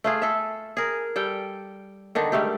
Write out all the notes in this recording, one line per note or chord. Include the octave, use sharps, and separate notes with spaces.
A3 F4 G#4
A4 E5
G#4 A#4
G3 A4 G5
D3 D#3 D4 D#4
G#2 G3 A3 G4